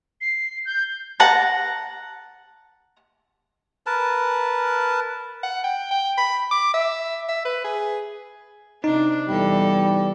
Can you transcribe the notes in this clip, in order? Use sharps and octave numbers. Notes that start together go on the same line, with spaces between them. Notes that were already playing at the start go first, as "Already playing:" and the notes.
C7
G6
F#5 A5 A#5
A#4 B4 A5
F#5
G5
G5
B5
D6
E5
E5
B4
G#4
C3 D4 D#4
E2 G3 A4